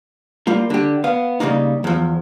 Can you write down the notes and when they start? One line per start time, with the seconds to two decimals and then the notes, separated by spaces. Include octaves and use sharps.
0.47 G3 A#3 F4
0.70 D3 G4
1.04 B3 F5
1.40 C#3 G3 A3 A#3 D#4
1.84 E2 F3